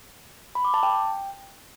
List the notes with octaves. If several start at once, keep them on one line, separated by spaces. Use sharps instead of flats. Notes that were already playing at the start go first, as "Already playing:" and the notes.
B5
D6
A5
G5